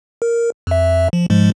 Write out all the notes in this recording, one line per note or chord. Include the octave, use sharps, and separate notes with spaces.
A#4
F2 E5
F3
G#2 F3 G#3